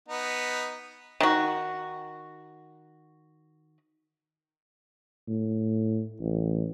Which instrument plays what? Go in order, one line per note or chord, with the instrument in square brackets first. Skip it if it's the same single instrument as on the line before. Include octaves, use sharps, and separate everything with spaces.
[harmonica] B3 D#4
[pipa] D#3 F#4
[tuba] A2
A1